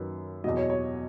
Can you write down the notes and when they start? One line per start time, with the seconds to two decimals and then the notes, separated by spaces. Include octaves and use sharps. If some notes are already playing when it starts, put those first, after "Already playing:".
Already playing: F#2 D#3 F#3 B4
0.44 E2 B2 F#3 D#5
0.57 C#5
0.70 C#5